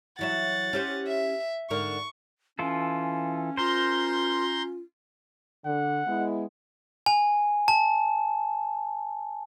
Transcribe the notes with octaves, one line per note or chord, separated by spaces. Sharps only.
E3 F#3 E5 F#5 A6
C#4 G4 C5
E5
G#2 D3 A#4 C#6
E3 C#4 F4 A4 G#5
F4 A#4 C5 A#5 C6 G6
D3 F#5
G#3 B3 E4
G#5
A5